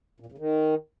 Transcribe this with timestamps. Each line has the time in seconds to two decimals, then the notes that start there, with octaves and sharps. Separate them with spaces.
0.20 A#2
0.26 E2
0.32 C#3
0.38 D#3